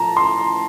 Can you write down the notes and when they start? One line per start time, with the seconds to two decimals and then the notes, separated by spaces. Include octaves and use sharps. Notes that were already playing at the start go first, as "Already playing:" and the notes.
Already playing: A2 F3 A5 A#5
0.17 C6